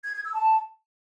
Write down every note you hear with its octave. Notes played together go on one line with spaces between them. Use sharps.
G#6
G#6
E6
A5